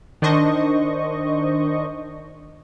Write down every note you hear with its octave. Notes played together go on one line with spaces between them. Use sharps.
D#3 D4 C5 D#5 C#6